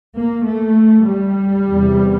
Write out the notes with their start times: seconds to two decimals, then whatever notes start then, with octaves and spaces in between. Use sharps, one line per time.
0.16 A#3
0.46 A3
1.06 G3
1.66 E2 C3